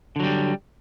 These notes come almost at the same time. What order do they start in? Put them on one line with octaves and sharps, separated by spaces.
D3 F#3 G3